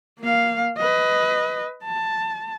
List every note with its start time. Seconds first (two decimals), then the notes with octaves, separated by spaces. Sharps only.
0.20 A#3 F5
0.77 B4 D#5
1.84 A5